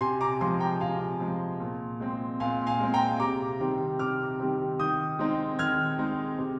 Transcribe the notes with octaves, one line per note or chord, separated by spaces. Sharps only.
C3 G#5 C6
A#5 D6
F3 G#3 G#5 C6
G5 A#5
C3 F5 G#5
F3 G#3
A#2
G#3 C4
A#2 F5 G#5
F5 G#5
G#3 C4
G5 A#5
C3 A#5 D6
D#3 G3 C4
C3 D6 F6
D#3 G3 C4
D#3 D#6 G6
G#3 C4 D#4
D#3 F6 G#6
G#3 C4 D#4
C3